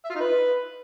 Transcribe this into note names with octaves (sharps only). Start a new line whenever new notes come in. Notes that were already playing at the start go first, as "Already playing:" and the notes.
E5
F4
D#4
B4